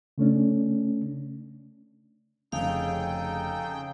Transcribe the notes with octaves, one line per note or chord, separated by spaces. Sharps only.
C#3 A3 C#4 D4
F1 C#3 D#4 G#4 A4 F5 G5